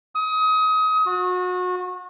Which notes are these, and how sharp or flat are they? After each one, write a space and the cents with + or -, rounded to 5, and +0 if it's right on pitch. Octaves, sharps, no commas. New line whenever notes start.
D#6 +30
F#4 -30